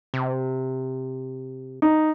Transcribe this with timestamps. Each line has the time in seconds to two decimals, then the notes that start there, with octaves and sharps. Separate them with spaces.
0.14 C3
1.82 D#4